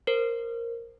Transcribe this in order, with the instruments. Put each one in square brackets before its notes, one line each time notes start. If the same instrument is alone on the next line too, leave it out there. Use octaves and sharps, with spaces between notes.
[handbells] A#4 C5